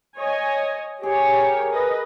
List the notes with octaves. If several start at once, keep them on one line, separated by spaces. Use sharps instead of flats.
C#5 D#5 G#5
G4 G#4 C#5
A#4
B4 D#5